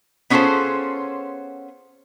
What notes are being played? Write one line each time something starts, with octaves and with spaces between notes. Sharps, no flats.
B3 C#4 F4 G#4 A4 C5